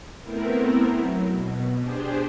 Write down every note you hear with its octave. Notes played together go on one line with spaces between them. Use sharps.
A3 B3 C4 E4 A#4
F#3
B2
D4 G4 G#4 C5